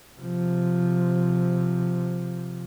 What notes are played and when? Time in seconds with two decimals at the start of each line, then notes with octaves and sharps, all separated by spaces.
0.20 C3 F3